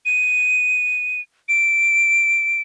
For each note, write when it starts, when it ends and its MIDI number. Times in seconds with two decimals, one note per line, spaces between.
0.06 1.21 99
1.49 2.61 98